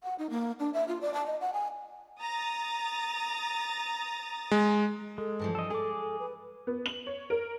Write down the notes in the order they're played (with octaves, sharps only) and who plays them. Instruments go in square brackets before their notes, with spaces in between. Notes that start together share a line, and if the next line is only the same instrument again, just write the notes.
[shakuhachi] F#5
D#4
A#3
D4
E5
F4
D5
A5
D#5
F#5
G#5
[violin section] A#5 D#6 A6
[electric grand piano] G#3
[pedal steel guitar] G#3 [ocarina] A4
[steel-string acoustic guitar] G2 E3 F3
[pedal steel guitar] A4 D#5
[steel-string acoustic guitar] G#3 [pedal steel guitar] G#4 D6 [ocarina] A4
[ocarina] A4
B4
[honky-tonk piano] B3
F#7
C#5
A#4